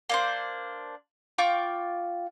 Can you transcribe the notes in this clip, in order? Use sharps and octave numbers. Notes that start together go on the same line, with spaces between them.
A#3 D4 C5
F4 G5 C#6 D6